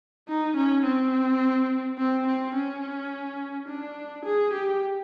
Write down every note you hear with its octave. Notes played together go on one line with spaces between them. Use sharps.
D#4
C#4
C4
C4
C4
C#4
D4
G#4
G4